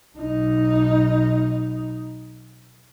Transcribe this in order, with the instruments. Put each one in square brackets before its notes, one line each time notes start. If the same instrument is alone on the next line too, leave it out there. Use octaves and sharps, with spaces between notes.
[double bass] B1 D#4